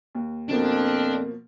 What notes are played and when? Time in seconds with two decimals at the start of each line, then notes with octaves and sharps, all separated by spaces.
0.15 D#2
0.49 F2 B2 F3 A#3 D4